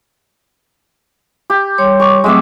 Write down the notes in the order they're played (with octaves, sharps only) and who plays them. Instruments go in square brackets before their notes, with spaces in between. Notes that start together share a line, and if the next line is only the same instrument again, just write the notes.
[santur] G4
[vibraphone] G3 C#5 C6
[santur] C#6 D6
[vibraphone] F#3 A3 C4 [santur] G#3 E5 D6